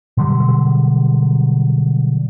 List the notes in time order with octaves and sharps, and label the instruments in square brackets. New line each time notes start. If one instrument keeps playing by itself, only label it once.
[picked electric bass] B2 D3 F#3 G3